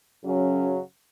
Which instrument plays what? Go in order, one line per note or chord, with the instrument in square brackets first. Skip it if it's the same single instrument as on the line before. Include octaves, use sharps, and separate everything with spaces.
[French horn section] F#2 C#3 F#3 C#4